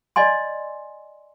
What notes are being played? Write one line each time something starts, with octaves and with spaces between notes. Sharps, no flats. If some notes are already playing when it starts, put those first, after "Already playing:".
D5 D#5 G#5 C6